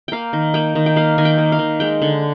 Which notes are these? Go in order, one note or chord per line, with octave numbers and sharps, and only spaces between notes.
A#3 F5 G5
D#3
A#3 G5
D#3
G5
A#3 F5
D#3 G#5
G5
A#3
F5
D#3
G#3 G5
D3